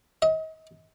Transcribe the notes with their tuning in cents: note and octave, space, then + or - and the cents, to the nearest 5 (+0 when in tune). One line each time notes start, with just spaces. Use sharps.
D#5 +35